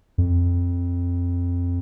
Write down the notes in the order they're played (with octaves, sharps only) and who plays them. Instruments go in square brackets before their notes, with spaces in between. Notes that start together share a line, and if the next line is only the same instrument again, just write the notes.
[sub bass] F2